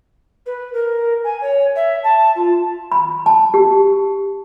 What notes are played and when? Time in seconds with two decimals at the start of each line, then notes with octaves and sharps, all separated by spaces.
0.46 B4
0.73 A#4
1.24 G#5
1.41 C#5
1.75 E5
2.03 A5
2.35 F4
2.92 B5
3.26 A5
3.54 G4